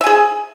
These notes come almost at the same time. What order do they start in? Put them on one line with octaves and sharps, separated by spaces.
E5 G#5 G#4